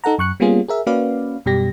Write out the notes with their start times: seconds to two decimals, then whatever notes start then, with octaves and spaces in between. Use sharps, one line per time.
0.04 D#4 A4 F#5 A#5
0.18 F#2 C#6 F#6 C#7
0.40 G3 A#3 B3 C#4 F4 G#4
0.68 G#4 A#4 E5
0.87 A#3 C#4 F#4 B4 D5 F5
1.46 F#2 B2 G3 G4 A#6